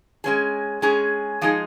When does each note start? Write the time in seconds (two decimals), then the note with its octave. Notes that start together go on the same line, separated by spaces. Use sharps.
0.24 G#3 C#4 G#4
0.82 G#3 C#4 G#4
1.41 F3 G#3 D#4 G#4